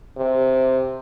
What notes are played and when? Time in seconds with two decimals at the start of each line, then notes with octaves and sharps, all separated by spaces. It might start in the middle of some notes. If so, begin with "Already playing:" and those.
0.17 C3